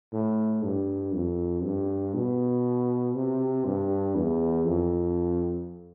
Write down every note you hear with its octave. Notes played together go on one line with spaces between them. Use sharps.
A2
G2
F2
G2
B2
C3
G2
E2
F2